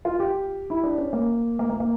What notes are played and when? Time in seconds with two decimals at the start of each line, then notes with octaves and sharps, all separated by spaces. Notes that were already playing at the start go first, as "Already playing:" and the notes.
0.05 F4
0.20 G4
0.70 E4
0.84 D4
0.98 C#4
1.13 A#3
1.59 A#3
1.70 A#3
1.80 A#3